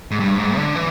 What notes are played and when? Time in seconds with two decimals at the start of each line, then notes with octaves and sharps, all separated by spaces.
0.11 G#2
0.19 G2
0.38 G#2
0.57 D3
0.76 E3